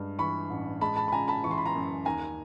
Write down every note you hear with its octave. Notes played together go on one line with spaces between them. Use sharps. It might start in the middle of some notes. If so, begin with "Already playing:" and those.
Already playing: G2 G#3
E3 B5 C#6
A1
G#3 A5 B5
A5 B5
B5
C#3 G#5 A#5
A5 B5
E3 C#6
C6
B5
A#5 C6
F#2
D#2 G#5 A#5